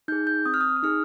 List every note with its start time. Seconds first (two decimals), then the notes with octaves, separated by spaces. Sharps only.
0.08 D#4 G#4 G6
0.27 G6
0.46 C4 D#6
0.54 F6
0.61 D#6
0.69 F6
0.77 D#6
0.83 D#4 G#4 F6